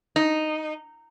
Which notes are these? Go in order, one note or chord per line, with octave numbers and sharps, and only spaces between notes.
D#4